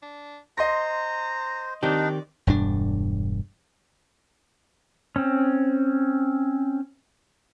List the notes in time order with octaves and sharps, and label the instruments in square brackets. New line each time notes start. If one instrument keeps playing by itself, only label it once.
[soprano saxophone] D4
[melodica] C5 [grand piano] D#5 C6 A#6 [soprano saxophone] A#5
[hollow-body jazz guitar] D#3 C4 G4 [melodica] D4 D#4 [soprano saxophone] D5
[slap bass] E1 G2 D4
[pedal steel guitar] C4 C#4